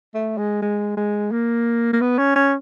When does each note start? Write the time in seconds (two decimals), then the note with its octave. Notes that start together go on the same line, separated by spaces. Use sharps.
0.15 A3
0.38 G#3
0.62 G#3
0.97 G#3
1.32 A#3
1.93 A#3
2.01 B3
2.18 C#4
2.36 C#4